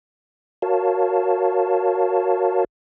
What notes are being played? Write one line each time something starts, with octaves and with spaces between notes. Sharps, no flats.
F#4 A#4 C#5 F5 A5